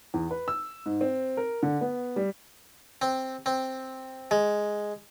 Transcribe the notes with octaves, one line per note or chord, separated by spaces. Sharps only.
E2
B4
E6
G#2
C4
A#4
D3
B3
G3
C4
C4
G#3